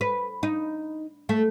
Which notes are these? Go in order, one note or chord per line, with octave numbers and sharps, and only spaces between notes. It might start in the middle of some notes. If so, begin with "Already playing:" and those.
B4
D#4
A3